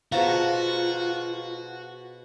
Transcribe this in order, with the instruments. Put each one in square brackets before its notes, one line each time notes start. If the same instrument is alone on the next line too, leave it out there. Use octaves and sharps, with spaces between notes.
[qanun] B2 A5 A#5 [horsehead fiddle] F4 [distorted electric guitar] F#4 [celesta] G#4 C5 F5